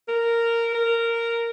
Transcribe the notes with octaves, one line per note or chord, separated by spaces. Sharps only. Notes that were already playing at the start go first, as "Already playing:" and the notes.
A#4
A#4